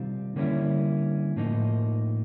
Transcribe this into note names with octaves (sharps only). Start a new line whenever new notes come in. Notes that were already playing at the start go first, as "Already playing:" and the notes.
Already playing: C3 D#3 G3 C4 F4
D3 G3 A#3 C#4 E4
A2 F3 A#3 D#4